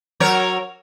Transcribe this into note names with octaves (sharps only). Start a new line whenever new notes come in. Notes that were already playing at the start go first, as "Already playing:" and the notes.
F#3 A#4 C#5